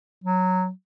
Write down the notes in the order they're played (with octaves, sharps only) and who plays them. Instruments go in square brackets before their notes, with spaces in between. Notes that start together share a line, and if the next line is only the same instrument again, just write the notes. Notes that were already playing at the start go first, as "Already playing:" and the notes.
[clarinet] F#3